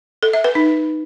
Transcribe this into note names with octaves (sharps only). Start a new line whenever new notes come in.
A4
E5
B4
D#4